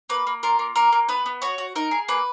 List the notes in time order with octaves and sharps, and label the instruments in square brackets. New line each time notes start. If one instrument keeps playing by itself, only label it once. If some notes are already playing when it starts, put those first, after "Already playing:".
[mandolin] A#3 B4
A#3
F4 A#4
A#3
A#3 A#4
A#3
B3 B4
B3
F#4 C#5
F#4
D#4 A#4
G#4
A#3 B4